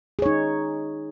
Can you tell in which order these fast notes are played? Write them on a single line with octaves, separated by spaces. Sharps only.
G#4 C#5 D#4